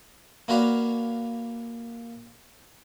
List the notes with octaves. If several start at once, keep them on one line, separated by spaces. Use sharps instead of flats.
A#3 C#4 F#4 B4 D5 F5